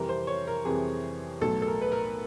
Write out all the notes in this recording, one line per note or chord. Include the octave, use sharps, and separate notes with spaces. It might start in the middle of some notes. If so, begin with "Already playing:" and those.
Already playing: F2 C3 E3 G3 A#4
C5
C#5
A#4
F2 C3 E3 G3 G#4
B1 A2 F#3 A4
A4
A#4
B4
A#4